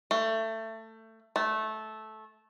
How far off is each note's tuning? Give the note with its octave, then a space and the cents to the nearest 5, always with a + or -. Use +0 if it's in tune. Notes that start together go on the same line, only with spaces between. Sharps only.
A3 +20
A3 -15